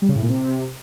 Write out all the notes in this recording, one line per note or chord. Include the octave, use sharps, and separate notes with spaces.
G3
C#3
A2
A#2
C3